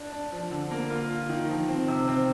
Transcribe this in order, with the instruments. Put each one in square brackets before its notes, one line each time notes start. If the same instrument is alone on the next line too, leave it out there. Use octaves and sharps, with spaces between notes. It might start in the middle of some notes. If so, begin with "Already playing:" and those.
Already playing: [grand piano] D4
D4
F3
D3
A#3
F4
F4
D#3
F3
C4
C3
C4